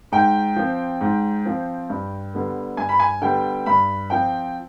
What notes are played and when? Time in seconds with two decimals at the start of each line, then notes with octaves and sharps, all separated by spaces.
0.12 G#2 G5
0.56 F3 C4
1.01 G#2
1.45 F3 C4
1.90 G2
2.34 D3 G3 B3
2.77 G2 G#5
2.89 B5
3.00 G#5
3.21 D3 G3 B3 G5
3.66 G2 B5
4.10 F3 C4 G5